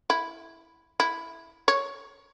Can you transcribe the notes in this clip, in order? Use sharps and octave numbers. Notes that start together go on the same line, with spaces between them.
E4
E4
C#5